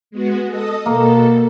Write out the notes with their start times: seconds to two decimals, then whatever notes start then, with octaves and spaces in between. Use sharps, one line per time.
0.11 G#3 B3 F#4
0.48 A4 D#5 D#6
0.86 B2 A#3 A4